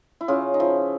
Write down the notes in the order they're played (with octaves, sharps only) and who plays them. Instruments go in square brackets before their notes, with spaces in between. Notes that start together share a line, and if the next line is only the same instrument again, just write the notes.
[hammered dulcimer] E4
C#3 F4
D#4
F3 E4